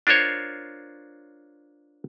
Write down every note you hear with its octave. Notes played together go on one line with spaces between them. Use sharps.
D4 F4 A#4 C5 C#5